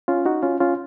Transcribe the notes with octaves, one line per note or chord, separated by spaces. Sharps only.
C#4 F4
D#4 F#4
C#4 F4
C#4 F4